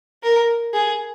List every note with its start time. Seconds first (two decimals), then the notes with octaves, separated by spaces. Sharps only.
0.23 A#4
0.74 G#4